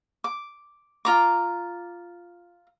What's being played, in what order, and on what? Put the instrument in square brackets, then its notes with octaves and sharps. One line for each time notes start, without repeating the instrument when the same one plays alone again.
[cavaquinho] D6
F4 A#5 D6